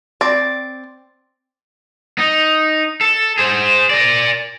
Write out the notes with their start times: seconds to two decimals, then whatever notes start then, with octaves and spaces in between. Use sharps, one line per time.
0.21 C4 D5
2.18 D#4
3.01 A4
3.38 G#4 C5
3.90 A#4 D5